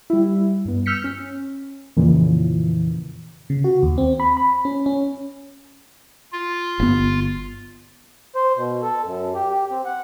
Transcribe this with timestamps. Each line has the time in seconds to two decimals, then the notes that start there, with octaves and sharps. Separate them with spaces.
0.10 G3 E4
0.65 G2 B3
0.86 E6 F6 G6 B6 C#7
1.04 C#4
1.96 F2 A#2 C#3 E3 F3
3.50 C#3
3.64 F#4
3.83 D#2
3.98 C4
4.20 B5
4.37 B5
4.65 C#4
4.86 C#4
6.32 F4
6.80 G1 B3
8.35 C5
8.57 B2
8.82 A4
9.04 F#2
9.35 G4
9.50 G4
9.70 C4
9.85 F#5